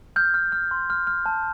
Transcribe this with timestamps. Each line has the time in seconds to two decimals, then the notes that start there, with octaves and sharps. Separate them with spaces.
0.16 F6 G6
0.34 F6
0.52 F6
0.71 C6
0.90 F6
1.07 F6
1.26 A5